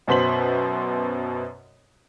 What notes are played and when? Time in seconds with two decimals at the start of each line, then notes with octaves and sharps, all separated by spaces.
0.08 F#2 B2 C5 B6 F#7